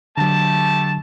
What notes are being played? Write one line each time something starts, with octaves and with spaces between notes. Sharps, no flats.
D3 F#3 A3 G4 A5